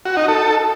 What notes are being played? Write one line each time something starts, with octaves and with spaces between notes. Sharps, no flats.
F#4
D#4
A4